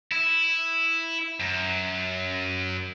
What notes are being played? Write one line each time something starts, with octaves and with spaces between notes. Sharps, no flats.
E4
F#2